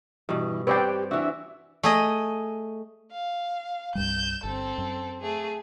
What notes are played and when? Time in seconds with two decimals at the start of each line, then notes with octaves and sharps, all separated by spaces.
0.29 G2 B2 E3
0.67 C4 G4 B4 C#5 D5 G5
1.11 E3 D4 F#4 E5
1.83 A3 G#4 D#5
3.11 F5
3.95 C2 G2 G3 G6 E7
4.44 G1 C4 A4
4.78 F#2
5.21 A3 G#4